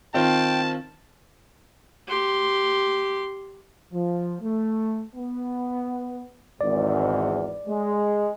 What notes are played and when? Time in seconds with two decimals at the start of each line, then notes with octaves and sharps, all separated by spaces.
0.14 D#3 C4 F4 G5 A5
2.08 G4 C6
3.92 F3
4.41 A3
5.15 B3
6.61 G#1 E2 G#2 D5
7.67 G#3